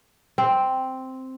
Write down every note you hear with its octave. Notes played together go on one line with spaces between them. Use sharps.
C4